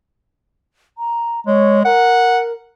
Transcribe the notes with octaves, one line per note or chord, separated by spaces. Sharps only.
A#5
G#3 C#5
A#4 F#5